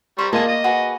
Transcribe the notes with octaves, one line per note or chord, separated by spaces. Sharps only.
G3 C5 A#5 C#6
A#3 F4 G#4 D5 D#5 A5
D#5
F#4 G#4 B4